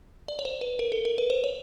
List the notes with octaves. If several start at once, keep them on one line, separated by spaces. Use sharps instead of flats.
D5
C#5
C5
B4
A#4
A4
A#4
B4
C5
C#5